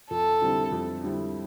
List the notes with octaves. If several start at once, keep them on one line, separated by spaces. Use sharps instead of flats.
F2 A4
D3 G3 C4 E4
F2
D3 G3 C4 E4